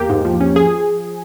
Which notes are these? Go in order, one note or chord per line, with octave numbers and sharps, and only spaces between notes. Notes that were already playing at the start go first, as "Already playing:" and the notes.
Already playing: E2 A#3 G4
G#2
F3
C#4
F3 G#4